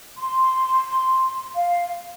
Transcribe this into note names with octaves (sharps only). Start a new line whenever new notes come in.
C6
F5